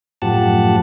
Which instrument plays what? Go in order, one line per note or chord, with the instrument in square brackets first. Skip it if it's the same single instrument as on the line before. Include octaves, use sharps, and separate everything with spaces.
[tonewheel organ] F#2 A2 F3 G4 F#5 A5